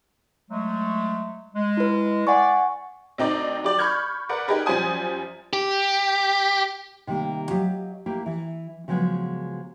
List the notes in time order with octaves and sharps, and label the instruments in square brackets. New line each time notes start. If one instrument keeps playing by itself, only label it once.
[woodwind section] F#3 G#3 A3
G#3
[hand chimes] E4 B4
[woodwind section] D5 [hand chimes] F#5 G#5 C#6
[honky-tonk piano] D2 C4 D#4 D5
F#3 G4 D5
B5 C#6 F6 G6 G#6
A#4 B4 D5 F#5
D#4 G4 G#4 A#4 B4
F#2 F3 G3 C5 G#5 D#6
[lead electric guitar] G4
[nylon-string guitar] C3 D#3 G3 A#3
F#3 G4 D#5 F5
A#3 E4 G4
E3
C#3 F3 F#3 G#3 B3